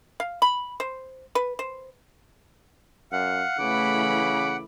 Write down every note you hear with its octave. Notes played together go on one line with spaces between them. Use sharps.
F5
B5
C5
B4
C5
F#2 F5 F#5
C#3 E3 A3 B5 D6